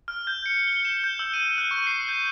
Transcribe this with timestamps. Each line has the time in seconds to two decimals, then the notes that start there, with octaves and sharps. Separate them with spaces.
0.08 F6
0.27 G6
0.46 C#7
0.68 G7
0.85 E7
1.04 G6
1.19 E6
1.34 D#7
1.58 F#6
1.71 C#6
1.87 C7
2.09 G6